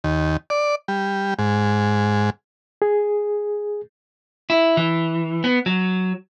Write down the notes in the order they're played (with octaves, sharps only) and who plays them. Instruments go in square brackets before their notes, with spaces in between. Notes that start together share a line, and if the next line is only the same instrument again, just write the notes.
[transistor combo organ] D#2
D5
G3
G#2
[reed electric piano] G#4
[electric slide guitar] E4
E3
B3
F#3